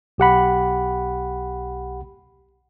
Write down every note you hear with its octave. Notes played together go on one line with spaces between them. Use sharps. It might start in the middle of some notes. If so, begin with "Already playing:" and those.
B1 G4 F#5 B5